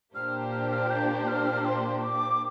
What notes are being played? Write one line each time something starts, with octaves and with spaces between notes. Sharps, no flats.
A#2 A#3 D4 G4 C5 F6
F6
F6
G6
F6
C6
D6